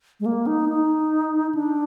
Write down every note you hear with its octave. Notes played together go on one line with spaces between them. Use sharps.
G#3
A#3
D#4
D#4
D4